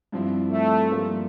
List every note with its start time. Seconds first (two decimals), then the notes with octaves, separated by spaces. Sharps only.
0.12 G2 F3 C4 E4
0.52 A3
0.91 G2 F3 A#3